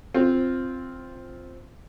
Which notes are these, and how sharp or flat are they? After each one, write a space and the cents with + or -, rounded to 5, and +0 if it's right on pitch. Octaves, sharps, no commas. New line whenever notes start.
C4 +0 F4 +0